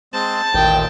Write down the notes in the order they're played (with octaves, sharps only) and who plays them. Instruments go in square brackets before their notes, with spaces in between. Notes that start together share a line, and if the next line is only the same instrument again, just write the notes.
[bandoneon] G#3 C4 C5 [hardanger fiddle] A5
[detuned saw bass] A1 [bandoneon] D#2 A#2 D#3 [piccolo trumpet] G5